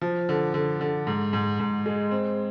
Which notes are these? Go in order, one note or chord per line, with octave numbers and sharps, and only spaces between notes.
F3
D3
D3
D3
G#2
G#2
G#2
G#3
C4